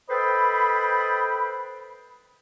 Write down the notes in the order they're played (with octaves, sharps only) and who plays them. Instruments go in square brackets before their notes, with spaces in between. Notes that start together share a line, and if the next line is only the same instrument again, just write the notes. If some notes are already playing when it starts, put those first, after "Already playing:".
[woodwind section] A4 B4 C5 D#5 G5 B5